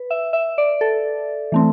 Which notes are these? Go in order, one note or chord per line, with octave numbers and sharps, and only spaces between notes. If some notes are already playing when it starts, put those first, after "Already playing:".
Already playing: B4
E5
E5
D5
A4
E3 A3 C4